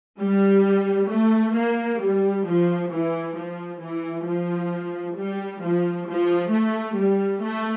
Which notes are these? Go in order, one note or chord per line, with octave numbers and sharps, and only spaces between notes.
G3
A3
A#3
G3
F3
E3
F3
E3
F3
G3
F3
F3
A3
G3
A3